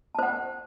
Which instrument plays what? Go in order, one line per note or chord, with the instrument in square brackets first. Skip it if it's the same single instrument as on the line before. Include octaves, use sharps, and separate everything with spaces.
[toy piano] A5
C5
F#5